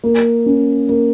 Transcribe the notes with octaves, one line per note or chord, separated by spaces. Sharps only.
A#3
C#4
A#3